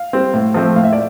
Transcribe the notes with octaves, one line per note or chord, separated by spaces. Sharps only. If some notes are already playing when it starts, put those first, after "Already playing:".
Already playing: F5
G3 C4
A2
F3 A3 C4
A2 F5
E5
D5